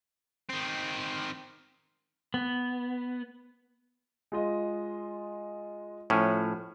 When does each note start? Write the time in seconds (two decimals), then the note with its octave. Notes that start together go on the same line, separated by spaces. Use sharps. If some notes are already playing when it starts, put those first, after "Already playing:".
0.49 D#3 C4
2.34 B3
4.32 G#3 F4 D#5
6.10 A2 F3 C#4 F6